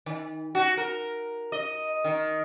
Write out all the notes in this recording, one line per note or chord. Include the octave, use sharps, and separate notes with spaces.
D#3
F#4
A#4
D#5
D#3